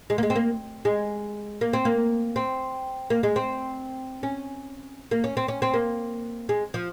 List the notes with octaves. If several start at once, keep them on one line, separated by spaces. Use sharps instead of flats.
G#3
A#3
G#3
C4
A#3
G#3
A#3
C4
A#3
C4
A#3
G#3
C4
C#4
A#3
C#4
C4
C#4
C4
A#3
G#3
F3